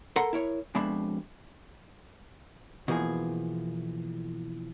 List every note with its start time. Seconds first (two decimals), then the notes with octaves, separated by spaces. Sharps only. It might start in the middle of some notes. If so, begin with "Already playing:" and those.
0.16 A4 A#4 F#5 B5 C6
0.33 E4 A#4 C#5
0.75 F2 B2 G#3 D4 E5 B5
2.88 B2 E3 F3 A#3 G#4